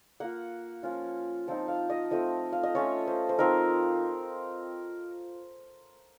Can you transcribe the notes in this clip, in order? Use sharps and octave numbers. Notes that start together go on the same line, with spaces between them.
A#3 F4 F#5
F3 A#3 C#4 F4
F3 C4 D#4 A5
F5
D#5
F3 A3 C4 D#5
F5
D#5
A3 C#4 F4 C#5
C5
C5
F3 C4 D#4 A#4